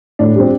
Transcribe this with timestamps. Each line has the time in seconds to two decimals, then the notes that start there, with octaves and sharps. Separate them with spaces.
0.19 A2 D4
0.35 G3 C4